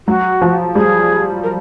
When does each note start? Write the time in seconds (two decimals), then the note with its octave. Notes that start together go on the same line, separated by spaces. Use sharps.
0.07 F#3 F#4
0.42 F3
0.75 G3 G#4
1.43 A#4